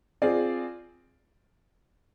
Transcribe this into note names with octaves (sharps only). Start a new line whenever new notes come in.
C4 F4 G#4 D5